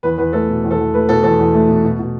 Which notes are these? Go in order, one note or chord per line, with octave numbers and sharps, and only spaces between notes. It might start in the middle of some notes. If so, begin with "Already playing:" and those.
E2 B4
E2 B4
A3 A4
B2
E2
A4
E2
A3 B4
B2 A4
E2 A4
E2
A3
B2
B2
B2